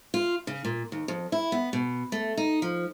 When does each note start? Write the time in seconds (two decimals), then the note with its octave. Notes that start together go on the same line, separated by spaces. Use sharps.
0.14 F4
0.47 C#3
0.65 A#2
0.92 D#2
1.08 F2
1.32 E4
1.52 B3
1.73 B2
2.12 A3
2.37 D#4
2.62 F3